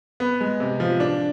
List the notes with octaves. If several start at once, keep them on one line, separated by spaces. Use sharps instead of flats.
B3
G#3
C3
F3
D4